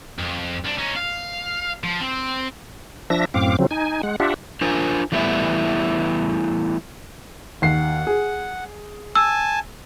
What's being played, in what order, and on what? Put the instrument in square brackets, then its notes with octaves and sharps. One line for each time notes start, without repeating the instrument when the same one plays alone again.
[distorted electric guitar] F2
C2 D4
C#4 D#4
F5
F3
C4
[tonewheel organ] F3 D4 E5 A#6
F#2 A2 C4 F5 D6
C#3 F3 F#3 C4
D#4 G#5
G#3 F#5
D4 F4 G4 E5 F#5
[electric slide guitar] D4 F4 A#4 C5 G#5
E3 G3 A3 B3 D4 E4
[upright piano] D#2 C7 [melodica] F#5
[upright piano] G#4
[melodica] G#5 A5 [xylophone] E6